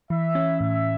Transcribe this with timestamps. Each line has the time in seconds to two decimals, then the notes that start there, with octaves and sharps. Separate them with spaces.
0.10 E3 E5
0.35 C#4
0.60 A2 E5